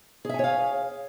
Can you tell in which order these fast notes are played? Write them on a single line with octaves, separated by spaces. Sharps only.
G#4 E5 G#5 C#5 F5